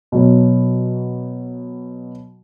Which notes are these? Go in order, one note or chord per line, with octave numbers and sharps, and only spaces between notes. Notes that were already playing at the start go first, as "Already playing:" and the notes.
B2 F#3